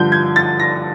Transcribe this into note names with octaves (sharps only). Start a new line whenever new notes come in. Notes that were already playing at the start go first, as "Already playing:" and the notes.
Already playing: G2 D3 F3 G6
G#6
A6
A#6